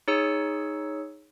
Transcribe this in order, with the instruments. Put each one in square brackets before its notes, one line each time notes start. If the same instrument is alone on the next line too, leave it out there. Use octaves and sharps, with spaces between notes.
[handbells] D#4 G#4 C#5 E6 C#7